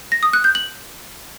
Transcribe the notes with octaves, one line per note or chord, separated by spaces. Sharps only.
A#6
D#6
F#6
G6
F#7